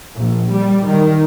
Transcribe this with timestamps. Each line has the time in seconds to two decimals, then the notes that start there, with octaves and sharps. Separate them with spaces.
0.17 A#1
0.52 G3
0.87 D#3